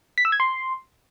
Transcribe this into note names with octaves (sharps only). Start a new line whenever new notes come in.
B6
E6
G#6
C6